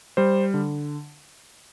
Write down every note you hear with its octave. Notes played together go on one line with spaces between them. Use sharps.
G3 C5
D3